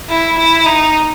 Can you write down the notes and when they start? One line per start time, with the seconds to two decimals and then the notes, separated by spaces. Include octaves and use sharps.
0.09 E4
0.38 E4
0.66 D#4